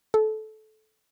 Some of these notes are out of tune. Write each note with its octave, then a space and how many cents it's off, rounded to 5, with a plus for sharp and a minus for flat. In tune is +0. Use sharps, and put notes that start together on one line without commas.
A4 -20